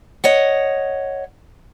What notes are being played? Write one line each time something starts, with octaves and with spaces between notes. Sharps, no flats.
C#5 D#5 F#5